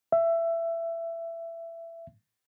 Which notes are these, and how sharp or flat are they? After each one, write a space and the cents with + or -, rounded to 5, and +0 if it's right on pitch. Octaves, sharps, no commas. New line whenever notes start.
E5 +20